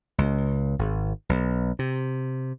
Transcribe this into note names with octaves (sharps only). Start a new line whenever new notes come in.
C#2
G#1
B1
C3